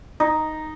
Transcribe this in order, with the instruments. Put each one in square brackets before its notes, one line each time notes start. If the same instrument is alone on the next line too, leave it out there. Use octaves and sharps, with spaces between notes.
[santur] D#4